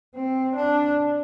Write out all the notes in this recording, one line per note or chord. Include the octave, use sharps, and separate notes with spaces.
C4
D4